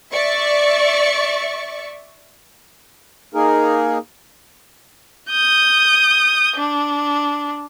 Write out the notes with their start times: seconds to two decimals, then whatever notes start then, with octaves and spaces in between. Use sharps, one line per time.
0.13 D5 E5 C#6
3.34 A#3 D#4 G#4 A#4
5.30 D#6 G6
6.57 D4